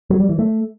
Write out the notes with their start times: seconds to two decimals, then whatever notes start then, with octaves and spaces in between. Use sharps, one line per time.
0.10 F#3
0.20 G3
0.29 E3
0.39 A3